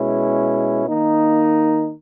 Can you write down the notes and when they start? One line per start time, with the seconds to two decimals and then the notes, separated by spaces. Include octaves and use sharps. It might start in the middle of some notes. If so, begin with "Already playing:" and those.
Already playing: B2 G#3 C#4 E4
0.88 D#3 A#3 D#4